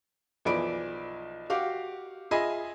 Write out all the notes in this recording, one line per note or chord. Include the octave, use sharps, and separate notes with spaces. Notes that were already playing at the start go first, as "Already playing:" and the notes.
B1 E3 F3 D5 B5 D7
F#4 G4 F5 D6
F4 G#4 D#5 E5 G#5 B5